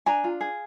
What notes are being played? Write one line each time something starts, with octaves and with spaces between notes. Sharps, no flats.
D4 G#5 A#5
F4
G#4